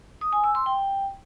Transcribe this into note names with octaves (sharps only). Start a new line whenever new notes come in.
D#6
G#5
E6
C6
G5